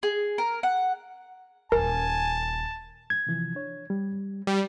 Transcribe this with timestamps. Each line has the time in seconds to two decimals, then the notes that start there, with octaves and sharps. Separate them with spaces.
0.03 G#4
0.38 A#4
0.63 F#5
1.72 D#1 G#1 A#4 G#5 A5
3.10 G#6
3.27 C3 E3 F3
3.55 D4 C#5
3.90 G3
4.47 G3